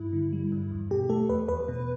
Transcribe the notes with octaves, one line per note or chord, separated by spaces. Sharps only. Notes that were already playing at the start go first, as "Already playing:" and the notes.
Already playing: G2 E4
D3
G3
G2
E2
B2 G4
A3 A4
E2 B4
E2 B4
B2